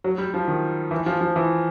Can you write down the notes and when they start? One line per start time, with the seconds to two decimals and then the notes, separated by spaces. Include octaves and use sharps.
0.04 F#3
0.18 G3
0.34 F3
0.48 D#3
0.91 E3
1.06 F3
1.21 F3
1.36 E3